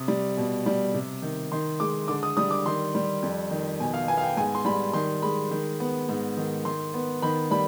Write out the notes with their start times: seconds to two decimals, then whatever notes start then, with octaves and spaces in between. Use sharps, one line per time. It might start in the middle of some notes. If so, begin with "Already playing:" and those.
Already playing: C3 D#6
0.08 G3
0.37 B2
0.66 G3
0.94 C3
1.22 D#3
1.52 D#3 C6
1.80 G#3 D6
2.08 D3 D6
2.23 D#6
2.37 G3 D#6
2.51 D6
2.66 D#3 C6
2.95 G3
3.22 F2
3.51 D#3
3.80 B2 G#5
3.94 F5
4.08 B3 G#5
4.17 F5
4.22 G5
4.37 G#2 G#5
4.55 C6
4.65 G3 B5
4.93 D#3 C6
5.22 G#3 B5
5.51 D#3
5.80 B3
6.09 G#2
6.37 D#3
6.65 D#3 C6
6.94 B3
7.22 D#3 B5
7.51 G3 B5